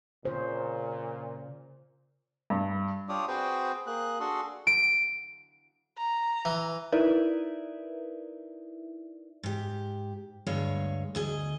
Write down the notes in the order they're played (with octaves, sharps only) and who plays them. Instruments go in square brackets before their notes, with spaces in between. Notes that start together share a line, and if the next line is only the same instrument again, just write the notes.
[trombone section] A#2 [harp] C#3 C#4 [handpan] F4 C5
[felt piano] G2
[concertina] D4 F4 G4 C#5 D5 D#6
C4 F#4 G#4 B4 C5 G5
A#3 G#4 F#6
D4 F#4 G#4 A4 C6
[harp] D7
[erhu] A#5
[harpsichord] E3
[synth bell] D#4 E4 A#4 B4 D5 E5
[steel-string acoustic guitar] G#2 G4
D2 G2 G#3 C#5 F5
D2 G#4 D#5